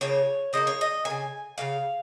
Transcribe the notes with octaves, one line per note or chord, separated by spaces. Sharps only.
C#3 F3 A#3 C#5
C#3 F3 A#3 D#5
C#5
D#5
C#3 A#3 G#5
C#3 A#3 F5